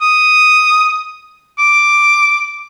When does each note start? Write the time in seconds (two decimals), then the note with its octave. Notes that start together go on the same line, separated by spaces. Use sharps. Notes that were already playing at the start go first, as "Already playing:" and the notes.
0.01 D#6
1.59 D6